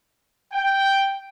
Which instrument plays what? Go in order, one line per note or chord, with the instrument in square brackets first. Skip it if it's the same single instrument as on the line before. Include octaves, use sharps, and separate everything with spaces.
[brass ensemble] G5